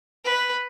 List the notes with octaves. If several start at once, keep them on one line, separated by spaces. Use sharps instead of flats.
B4